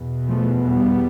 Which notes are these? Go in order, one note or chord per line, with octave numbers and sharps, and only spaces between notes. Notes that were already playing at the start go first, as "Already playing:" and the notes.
Already playing: E2 B2
F3 A3
G3 B3